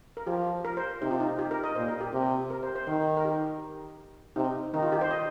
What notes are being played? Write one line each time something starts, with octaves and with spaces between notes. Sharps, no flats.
A#4
F3 G4
A#4
C5
C3 D#4
F4
D#4
G4
A#4
D#5
A#2 C5
A#4
G4
C3
A#4
C5
C5
D#3 A#4
A#4
G4
C3 D#4
D#3 D#4
F4
G4
C5
D#5